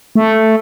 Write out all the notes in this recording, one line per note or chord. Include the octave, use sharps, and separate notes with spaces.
A3